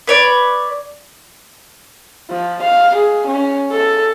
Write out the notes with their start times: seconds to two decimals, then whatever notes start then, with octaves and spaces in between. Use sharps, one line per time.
0.07 B4 C#5 D5
2.30 F3
2.63 F5
2.96 G#4
3.28 C#4
3.72 A4